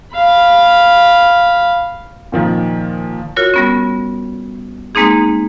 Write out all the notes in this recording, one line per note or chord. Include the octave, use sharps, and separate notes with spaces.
F5 B5
A#2 D#3 F3
F4 F#4 A#4 C#5
G3 B3 C#4
G#3 A#3 C4 D#4 G#4